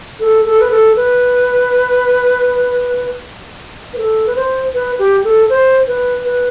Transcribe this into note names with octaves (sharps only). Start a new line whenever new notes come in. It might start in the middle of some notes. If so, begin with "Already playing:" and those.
A4
A4
B4
A4
B4
B4
A4
B4
C5
B4
G4
A4
C5
B4
B4